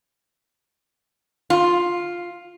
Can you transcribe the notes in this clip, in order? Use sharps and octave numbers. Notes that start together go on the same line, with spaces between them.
F4